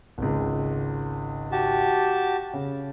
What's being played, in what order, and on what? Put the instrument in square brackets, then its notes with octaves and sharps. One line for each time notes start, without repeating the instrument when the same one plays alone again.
[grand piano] G#1 C#2
[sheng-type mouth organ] F#4 G4 A5
[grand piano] C#3